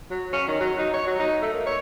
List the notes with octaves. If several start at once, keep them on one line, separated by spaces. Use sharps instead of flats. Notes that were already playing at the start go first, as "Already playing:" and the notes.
F#3
C#4
D#3
F#3
D#4
C#5
F#3
D#4
A3
A#3
C#5